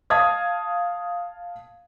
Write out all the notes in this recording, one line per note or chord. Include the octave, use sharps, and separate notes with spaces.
F5 A5 D#6 G#6